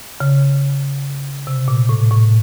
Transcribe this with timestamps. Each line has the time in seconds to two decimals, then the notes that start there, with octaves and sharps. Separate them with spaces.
0.20 C#3
1.47 C3
1.68 A#2
1.89 A2
2.11 A2